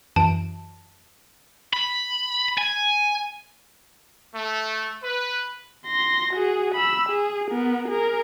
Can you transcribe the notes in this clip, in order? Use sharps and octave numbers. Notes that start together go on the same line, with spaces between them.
F#2 E3 A5 D7
B5
G#5
A3
B4
C6 A#6
F#4 G#4
B5 E6
G#4
B3 A#4
G#4 A#4